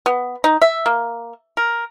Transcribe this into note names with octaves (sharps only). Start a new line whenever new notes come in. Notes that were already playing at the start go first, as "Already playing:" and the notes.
B3
D#4
E5
A#3
A#4